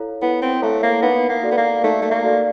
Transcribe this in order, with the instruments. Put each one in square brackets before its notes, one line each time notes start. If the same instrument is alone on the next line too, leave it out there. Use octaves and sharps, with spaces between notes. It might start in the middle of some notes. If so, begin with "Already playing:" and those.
Already playing: [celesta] E4 A4 C#5 F5 A#5
[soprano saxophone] B3 [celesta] E4
[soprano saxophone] C4
[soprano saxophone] A3 [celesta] A4 C#5 F5 A#5
[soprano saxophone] A#3
[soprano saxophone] B3 [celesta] D#4
[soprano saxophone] A#3
[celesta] F#4 A4 D5
[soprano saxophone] B3
A#3
[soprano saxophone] A3 [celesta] D#4
[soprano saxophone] A3
A#3
[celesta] F#4 A4 D5